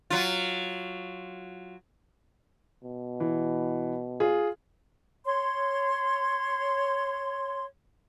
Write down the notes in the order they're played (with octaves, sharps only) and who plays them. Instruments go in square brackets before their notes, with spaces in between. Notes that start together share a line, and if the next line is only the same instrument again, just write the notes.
[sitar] F#3 F4
[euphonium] B2
[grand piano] E3
F4 G#4
[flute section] C#5 C6